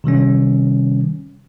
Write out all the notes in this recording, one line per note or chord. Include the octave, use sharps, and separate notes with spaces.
C3 D#3 G3 C#4